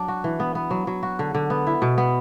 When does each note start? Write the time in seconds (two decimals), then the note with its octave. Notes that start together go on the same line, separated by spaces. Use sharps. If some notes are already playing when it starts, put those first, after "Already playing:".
Already playing: F#3 D4
0.08 F#4
0.24 E3
0.40 B3
0.55 B3
0.71 F#3
0.87 F#3
1.03 F#4
1.19 D3
1.35 D3
1.50 B3
1.67 E4
1.82 B2
1.98 B3